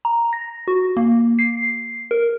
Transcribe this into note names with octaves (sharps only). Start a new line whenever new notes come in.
A#5
A#6
F#4
A#3
C7
A#4